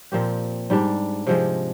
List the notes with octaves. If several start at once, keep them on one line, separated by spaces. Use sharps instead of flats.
A#2 F3 C4 G4
G#2 G3 D4
C3 F3 G#3